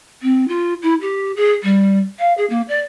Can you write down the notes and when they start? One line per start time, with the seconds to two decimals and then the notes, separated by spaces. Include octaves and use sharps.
0.22 C4
0.48 F4
0.82 E4
1.01 G4
1.36 G#4
1.63 G3
2.19 F5
2.37 G#4
2.50 A#3
2.68 D5